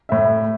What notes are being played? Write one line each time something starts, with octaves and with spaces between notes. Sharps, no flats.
A2 E5